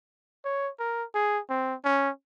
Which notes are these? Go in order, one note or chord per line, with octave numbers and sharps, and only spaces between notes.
C#5
A#4
G#4
C4
C#4